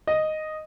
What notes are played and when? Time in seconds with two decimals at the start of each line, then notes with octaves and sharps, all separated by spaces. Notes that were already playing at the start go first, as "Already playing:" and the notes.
0.07 D#5